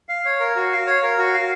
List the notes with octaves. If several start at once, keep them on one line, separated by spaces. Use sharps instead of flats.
F5
C#5
A#4
F#4
F5
C#5
A#4
F#4
F5